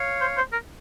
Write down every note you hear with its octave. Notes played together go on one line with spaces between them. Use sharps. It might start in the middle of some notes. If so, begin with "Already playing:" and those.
Already playing: C#5 F5
C5
C5
A#4